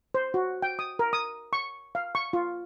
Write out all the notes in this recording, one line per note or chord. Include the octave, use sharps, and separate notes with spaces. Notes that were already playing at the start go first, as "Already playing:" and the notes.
C5
F#4
G5
D#6
A#4
D#6
C#6
F5
C#6
F4